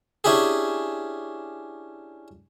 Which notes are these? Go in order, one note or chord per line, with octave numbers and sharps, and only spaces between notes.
C#4 D4 E4 G4 G#4